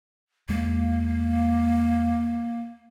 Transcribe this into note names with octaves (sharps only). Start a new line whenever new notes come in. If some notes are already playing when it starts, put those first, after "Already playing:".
E2 G#3 A#3